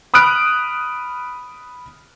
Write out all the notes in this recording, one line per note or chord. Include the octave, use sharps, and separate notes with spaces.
B5 D#6 F6 F#6 D7